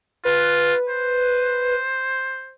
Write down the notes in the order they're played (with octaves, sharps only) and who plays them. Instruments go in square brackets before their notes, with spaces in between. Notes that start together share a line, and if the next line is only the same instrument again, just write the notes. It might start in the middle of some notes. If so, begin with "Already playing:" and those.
[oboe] F4 [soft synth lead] B4
[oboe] C5